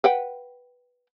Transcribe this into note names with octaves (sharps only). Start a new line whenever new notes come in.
B4 F#5 G5